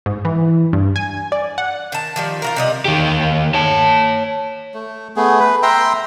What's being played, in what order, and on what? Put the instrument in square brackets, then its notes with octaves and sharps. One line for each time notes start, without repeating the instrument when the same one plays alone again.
[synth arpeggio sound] G#2
E3
G2
G#5
D5
F#5
[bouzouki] D#3 A5
D#3 F3 G3
F4 F#4 A#4
C3 G3 D#5
[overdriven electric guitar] D#3 G4
C#5 A5
[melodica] A3
A3 B3 G#4
B4
E5 G5 A#5 C6